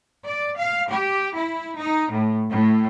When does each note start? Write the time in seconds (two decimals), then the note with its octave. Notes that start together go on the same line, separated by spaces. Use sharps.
0.25 D5
0.57 F5
0.89 G4
1.34 E4
1.77 D#4
2.11 A2
2.50 A2